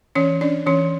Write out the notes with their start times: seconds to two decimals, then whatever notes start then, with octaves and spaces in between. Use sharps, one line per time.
0.15 E3 C#4 C#5
0.41 C#4 D4 D5
0.66 E3 C#4 C#5